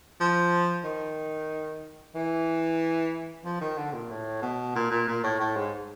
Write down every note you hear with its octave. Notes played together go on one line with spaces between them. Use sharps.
F3
D#3
E3
F3
D#3
D3
A#2
A2
B2
A#2
A#2
A#2
A2
A2
G#2